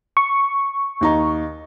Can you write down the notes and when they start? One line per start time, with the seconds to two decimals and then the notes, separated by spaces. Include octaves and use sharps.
0.17 C#6
1.01 D#2 D#4 A#5